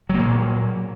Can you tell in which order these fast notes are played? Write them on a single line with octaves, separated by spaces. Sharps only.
F#3 A#3 A#2